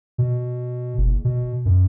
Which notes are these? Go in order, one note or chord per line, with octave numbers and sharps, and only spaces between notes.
B2
F#1
B2
F#2